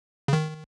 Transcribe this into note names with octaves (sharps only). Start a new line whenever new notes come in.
C#3
D#3